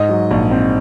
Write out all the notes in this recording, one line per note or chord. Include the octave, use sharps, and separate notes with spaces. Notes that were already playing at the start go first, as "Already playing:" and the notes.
Already playing: G#2 D#5
F#3
A#1
C4